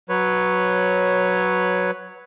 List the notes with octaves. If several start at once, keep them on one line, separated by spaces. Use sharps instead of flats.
F#3 B4 C#5